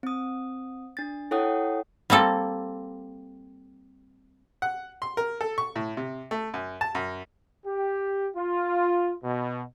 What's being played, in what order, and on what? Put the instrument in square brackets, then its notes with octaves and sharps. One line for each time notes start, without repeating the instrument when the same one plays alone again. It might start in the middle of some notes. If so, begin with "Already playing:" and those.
[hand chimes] C4 D#6
D4 A6
E4 A4 C#5 F#5 G5 D#6
[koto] G3 A#3 C4 A4
[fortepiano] F#5
C6
A#4
A4
C#6
A2
C3
A3
F#2
A5
F#2
[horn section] G4
F4
B2